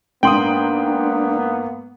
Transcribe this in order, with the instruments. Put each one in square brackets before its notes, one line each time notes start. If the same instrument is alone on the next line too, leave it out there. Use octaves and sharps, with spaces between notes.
[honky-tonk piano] G#2 F#7 [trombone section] A#3 B3 [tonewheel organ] D4 [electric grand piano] G5 C6 D#6